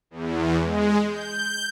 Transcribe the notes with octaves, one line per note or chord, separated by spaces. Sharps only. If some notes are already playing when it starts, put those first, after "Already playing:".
E2
G#3
G6